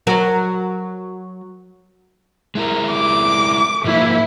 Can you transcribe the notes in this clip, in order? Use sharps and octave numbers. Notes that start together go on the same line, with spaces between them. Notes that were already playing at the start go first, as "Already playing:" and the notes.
F#3 A#4
G#3 E4 A#4
D6
G#2 F3 A#3 E4